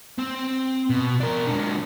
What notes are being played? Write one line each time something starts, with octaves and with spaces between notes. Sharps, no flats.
C4
B2
D4 A#4
D3 G#3